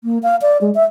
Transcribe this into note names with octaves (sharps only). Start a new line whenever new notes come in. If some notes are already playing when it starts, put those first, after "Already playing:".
A#3
F5
D5
G#3
E5